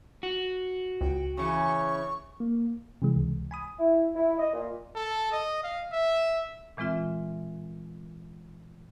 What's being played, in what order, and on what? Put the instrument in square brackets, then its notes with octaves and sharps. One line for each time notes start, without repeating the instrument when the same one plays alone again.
[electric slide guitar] F#4
[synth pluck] C#2 [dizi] G5
[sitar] C#3 E3 [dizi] C#6
[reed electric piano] A#3
[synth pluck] C3 E3 G#3
C#2
G#5 B5 D#6
[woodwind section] E4
E4
D#5
A#2
[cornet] A4
D#5
F5
E5
[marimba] A#2 E3 G#3 C4 F4 E5